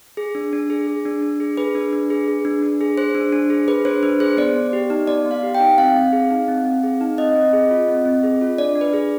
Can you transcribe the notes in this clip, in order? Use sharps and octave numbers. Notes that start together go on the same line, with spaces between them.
G#4
D4
D4
G#4
G#4
D4
D4
G#4
G#4 B4
D4
D4
G#4
G#4
D4
D4
G#4
G#4 C5
D4
D4
G#4
G#4 B4
D4 C5
D4 B4
G#4 C5
B3 D5
B3
G4
D#4
B3 D5
B3
F5
G4
G5
D#4
C4 F5
C4
G#4
D#4
C4
C4
G#4
D#4
C4 D#5
C4
G#4
F4
C4
C4
G#4
F4
D4 D5
D4
B4
G#4